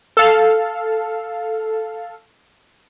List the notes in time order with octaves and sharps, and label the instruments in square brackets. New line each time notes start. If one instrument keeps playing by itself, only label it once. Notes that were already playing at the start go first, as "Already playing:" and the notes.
[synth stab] A4 F5